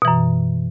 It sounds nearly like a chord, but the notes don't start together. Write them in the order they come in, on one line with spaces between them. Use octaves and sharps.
B2 E3 F#2